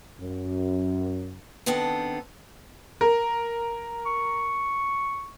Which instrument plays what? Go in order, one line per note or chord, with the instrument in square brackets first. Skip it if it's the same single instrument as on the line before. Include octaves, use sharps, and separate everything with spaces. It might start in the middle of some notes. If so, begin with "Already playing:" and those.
[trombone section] F#2
[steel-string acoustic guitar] D#3 B3 C4 D4 A4
[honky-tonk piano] A#4
[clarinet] C#6